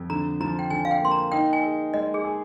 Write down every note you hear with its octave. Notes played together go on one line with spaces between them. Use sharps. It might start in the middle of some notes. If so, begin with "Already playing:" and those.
Already playing: F2
D3 A#5
F3 A#5
G5
D3 G#5
F5
G5
A#3 C6
A#5
D#4 G5
G#5
G#4
G#3 D#5
G#4
G#4